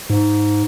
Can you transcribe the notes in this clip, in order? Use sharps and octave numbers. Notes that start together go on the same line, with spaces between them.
G#2